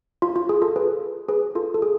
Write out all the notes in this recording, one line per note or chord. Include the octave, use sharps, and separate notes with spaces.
F4
F4
G#4
F4 A4
G#4 B4
G#4 B4
F4 A4
A4
G#4